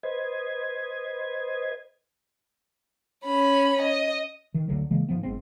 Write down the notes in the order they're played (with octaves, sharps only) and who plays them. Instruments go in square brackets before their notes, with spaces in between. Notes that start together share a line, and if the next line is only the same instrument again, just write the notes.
[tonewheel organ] B4 C5 D#5 G#6
[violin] C#4 B5
D#5
[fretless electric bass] D#3
D2 D3 F#3
C#3 E3 G#3 A#3
G#2 F3 B3
F#1 G#2 B3 C4